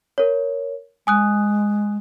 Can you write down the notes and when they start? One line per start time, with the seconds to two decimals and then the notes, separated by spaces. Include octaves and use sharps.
0.18 A#4 C#5
1.07 G#3 G#5 D#6 F#6